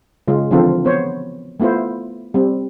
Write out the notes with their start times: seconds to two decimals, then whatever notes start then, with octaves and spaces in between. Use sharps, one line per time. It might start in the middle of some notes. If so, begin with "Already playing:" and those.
0.28 C#3 G#3 F4
0.51 D3 E3 F3 C4 F4 A4
0.85 B3 C5 C#5
1.60 A3 B3 E4 F4 C5
2.34 G3 C4